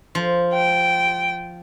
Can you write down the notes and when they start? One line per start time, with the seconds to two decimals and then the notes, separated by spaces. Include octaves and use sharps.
0.15 F3
0.54 G5